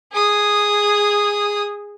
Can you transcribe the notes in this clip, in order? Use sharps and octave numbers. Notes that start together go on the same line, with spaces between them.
G#4 D#6